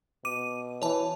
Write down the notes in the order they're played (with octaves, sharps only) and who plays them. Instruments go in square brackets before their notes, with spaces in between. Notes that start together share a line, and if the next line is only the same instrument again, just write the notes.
[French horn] B2 [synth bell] D6 D#7
[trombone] E3 [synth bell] C#5 A5